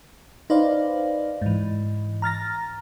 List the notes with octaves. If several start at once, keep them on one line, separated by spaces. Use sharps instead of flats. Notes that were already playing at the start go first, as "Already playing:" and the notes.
D#4 B4 C5 D5 F5
G#2 E3
A#5 F6 A6 A#6